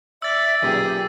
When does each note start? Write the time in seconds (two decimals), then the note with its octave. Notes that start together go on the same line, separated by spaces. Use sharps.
0.22 D5 E5 E6 A6
0.62 B1 A#2 G4 G#4 G5